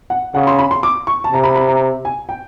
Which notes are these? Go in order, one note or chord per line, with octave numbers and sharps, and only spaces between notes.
F#5
C#3 F#5
C6
B5
C6
D6
C#6
A5
C3 A#5
B5
B5
A#5
G#5
G5